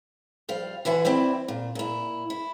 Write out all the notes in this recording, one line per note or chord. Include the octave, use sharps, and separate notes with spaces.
F3 G3 F5
D3 E3 F#4 E5 G#5
C4 E4 D5 E5
A#2
A#2 E4
E4